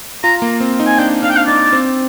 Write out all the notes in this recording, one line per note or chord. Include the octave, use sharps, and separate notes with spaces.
F4 A#5
A#3
C4
D#4
G#5
D4 G5
D4 F5
G5
F5
D#4 D5
C4